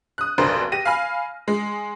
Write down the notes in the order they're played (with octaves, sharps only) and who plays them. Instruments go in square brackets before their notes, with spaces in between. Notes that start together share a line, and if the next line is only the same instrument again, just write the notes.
[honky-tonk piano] D#6 F#6
F1 B1 D3 A#4 C5
G4 A#6 D#7
F5 G#5 B5 F6
G#3